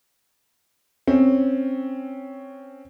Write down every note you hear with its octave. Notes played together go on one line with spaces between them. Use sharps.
C4 C#4